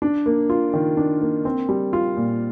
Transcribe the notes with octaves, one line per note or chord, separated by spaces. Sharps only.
D4
A#3
F4
D#3
D4
A#3
C4
G3
F4
A#2